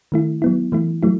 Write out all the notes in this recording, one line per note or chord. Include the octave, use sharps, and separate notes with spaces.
D#3 A3 E4
F#3 B3 E4
E3 A3 E4
F#3 A3 E4